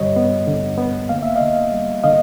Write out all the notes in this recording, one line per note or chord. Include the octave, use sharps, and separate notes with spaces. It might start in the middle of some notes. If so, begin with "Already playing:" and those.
Already playing: G2 D3 G3 C#5 D#5
B3
D3
B3
A#3 F5
E5
D#5 F5
D3
G3
D3 D#5 F5